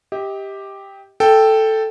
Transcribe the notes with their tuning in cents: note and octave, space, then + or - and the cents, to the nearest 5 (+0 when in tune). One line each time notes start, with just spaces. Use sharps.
G4 +5 D#5 +40
A4 +0 G5 +0